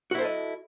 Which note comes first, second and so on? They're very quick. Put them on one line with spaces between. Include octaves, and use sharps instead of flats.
F#4 E4 C5 A4 D#5